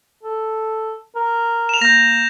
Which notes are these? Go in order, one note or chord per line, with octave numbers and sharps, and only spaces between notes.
A4
A#4
E7 F7
A#3 G6 A#6